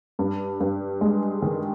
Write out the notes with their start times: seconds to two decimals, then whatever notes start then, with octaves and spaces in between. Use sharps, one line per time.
0.19 G2
0.60 G2
1.01 G#3
1.42 D#3